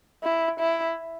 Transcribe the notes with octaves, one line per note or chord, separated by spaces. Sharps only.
E4
E4